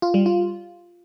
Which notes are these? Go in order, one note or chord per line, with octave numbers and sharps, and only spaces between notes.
F4
G3
F4